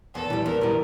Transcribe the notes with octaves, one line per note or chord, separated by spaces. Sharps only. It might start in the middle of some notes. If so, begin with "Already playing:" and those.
E2 A4
E3 G3
E2 A#4
E3 G3